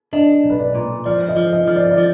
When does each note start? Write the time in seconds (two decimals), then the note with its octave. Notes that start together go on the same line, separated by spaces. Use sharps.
0.13 D4 D#5
0.44 B1
0.50 B4
0.59 D5
0.75 A#2
1.05 F3 D5
1.29 D#5
1.37 F3
1.52 D#5
1.68 F3
1.76 D5
1.83 D#5
1.91 D5
1.98 F3